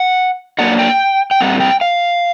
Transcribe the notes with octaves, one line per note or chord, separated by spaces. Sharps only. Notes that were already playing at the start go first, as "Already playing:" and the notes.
Already playing: F#5
F#3 A#3 D4 F#5
G5
G5
A#2 G3 C4 F#5
G5
F5